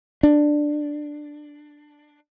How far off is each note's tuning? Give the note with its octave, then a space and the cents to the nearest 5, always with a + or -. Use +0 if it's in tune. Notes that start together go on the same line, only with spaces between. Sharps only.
D4 +10